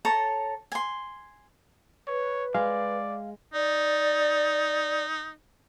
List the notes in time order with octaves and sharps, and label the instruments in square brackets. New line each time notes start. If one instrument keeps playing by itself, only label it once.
[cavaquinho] A4 C#5 A5 A#5
G#5 C6
[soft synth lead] B4 [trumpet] C#5
[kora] G#3 [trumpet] D5 [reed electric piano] F5
[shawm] D#4 [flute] D5